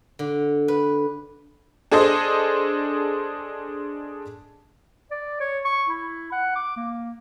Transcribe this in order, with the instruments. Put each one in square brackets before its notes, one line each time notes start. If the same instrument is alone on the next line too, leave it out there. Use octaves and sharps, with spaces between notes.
[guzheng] D3
B4
[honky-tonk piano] D4 G#4 A4 C5 D#5
[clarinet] D5
C#5
C#6
E4
F#5
D6
A#3